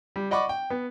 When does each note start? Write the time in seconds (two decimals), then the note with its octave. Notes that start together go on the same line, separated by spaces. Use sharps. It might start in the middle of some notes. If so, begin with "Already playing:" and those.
0.16 G3
0.31 D5 D#5 F#5 B5 C#6 D6
0.49 G5
0.70 B3